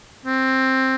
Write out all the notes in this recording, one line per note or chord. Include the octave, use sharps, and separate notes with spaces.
C4